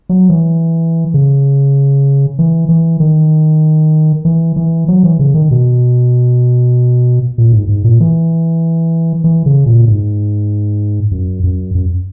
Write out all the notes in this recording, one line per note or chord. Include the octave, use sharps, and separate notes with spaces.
F#3
E3
C#3
E3
E3
D#3
E3
E3
F#3
E3
C#3
D#3
B2
A#2
G#2
G#2
A#2
E3
E3
C#3
A#2
G#2
F#2
F#2
F#2